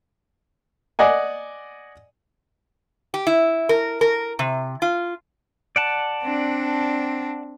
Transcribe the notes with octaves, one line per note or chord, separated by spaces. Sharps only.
D5 D#5 F#5 G#5
G4
E4
A#4
A#4
C3
F4
D5 F#5 A5
C4 D4